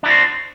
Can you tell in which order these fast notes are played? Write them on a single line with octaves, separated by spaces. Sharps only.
D4 E4 F#4 C5